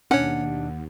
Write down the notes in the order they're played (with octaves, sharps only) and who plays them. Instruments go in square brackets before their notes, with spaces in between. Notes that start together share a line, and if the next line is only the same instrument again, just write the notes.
[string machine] D#2 [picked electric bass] B2 D4 [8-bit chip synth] C#4 C#5 [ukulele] F#5